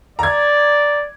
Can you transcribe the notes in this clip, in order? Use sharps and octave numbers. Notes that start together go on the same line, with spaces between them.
D5 A#5 G#6